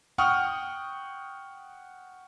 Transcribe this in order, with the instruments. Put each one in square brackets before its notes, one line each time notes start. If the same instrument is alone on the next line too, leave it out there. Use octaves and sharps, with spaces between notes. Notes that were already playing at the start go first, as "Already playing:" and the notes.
[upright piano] F#5 G5 C#6 D#6 F6